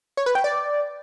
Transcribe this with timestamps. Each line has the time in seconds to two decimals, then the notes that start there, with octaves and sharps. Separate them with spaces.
0.17 C#5
0.26 B4
0.35 G5
0.44 D5